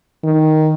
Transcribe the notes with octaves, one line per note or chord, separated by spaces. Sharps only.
D#3